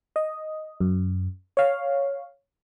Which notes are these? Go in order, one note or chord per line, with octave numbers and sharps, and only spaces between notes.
D#5
F#2
C#5 F5